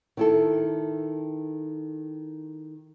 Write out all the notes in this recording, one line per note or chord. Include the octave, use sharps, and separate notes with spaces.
D#3 E4 A4